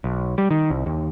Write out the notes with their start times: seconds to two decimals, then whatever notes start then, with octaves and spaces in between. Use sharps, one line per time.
0.04 B1
0.38 G3
0.51 D#3
0.70 C2
0.86 D#2